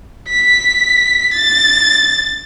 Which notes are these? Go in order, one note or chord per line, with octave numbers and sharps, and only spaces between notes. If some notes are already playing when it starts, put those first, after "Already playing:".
B6
A6